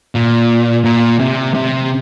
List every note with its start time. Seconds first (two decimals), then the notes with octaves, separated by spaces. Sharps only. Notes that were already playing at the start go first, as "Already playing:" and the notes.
0.15 A#2
0.85 A#2
1.20 C3
1.55 C3